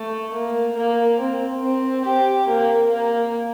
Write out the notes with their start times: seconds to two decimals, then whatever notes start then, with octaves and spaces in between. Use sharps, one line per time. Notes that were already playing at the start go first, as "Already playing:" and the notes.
Already playing: A3
0.33 A#3
0.76 A#3
1.20 C4
1.62 C4
2.05 G4
2.48 A#3
2.89 A#3